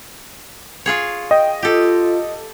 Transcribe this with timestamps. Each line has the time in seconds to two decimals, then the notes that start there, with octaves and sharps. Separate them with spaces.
0.86 F4 G#4 C#5
1.31 D#5 G5
1.63 F4 G4 A4